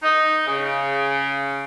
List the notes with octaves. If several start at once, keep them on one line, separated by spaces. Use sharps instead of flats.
D#4
C#3